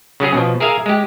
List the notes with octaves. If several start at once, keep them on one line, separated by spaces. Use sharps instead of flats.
C#3 F#3 C#4 G#4
B2 F3
G#4 A#4 E5 F5 G#5
G#3 G4